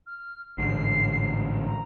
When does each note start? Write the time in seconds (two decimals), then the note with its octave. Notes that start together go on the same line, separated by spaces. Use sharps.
0.07 F6
0.58 A1 G#2 D3 C7
1.67 A#5